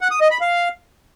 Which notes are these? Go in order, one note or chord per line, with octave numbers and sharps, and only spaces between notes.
F#5
D#6
D#5
B5
F5